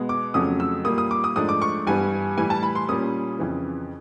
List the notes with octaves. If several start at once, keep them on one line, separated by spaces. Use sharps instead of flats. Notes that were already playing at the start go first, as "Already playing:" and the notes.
Already playing: B2 G#3 B3
D6
F2 C#3 F#3 A3 C#4 D#6
E6
A#2 G3 A#3 D#6
D#6
D6
D#6
G#2 F3 A3 D4 D#6
D6
C#6
G2 E3 G3 B3 G#5
A2 E3 G3 G#5
A5
B5
C6
A#2 G3 A#3 C#4 D#6
F2 C#3 E3